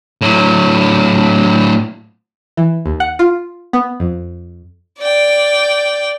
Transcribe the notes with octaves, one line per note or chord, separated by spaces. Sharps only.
A2 F#3
E3
D#2
F#5
F4
B3
F2
D5 G5